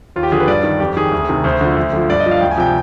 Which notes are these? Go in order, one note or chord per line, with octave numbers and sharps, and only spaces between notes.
D#2 F4
G4
D3 F3 G#4
B4
G2 D5
D#3
F2 G4
D#3 G#4
D2
C3 D#3
D2 C5
D3 F3
D2
D3 F3
G2 D5
D#5
F3
F5
D2 G5
G#5
C3 F3 G5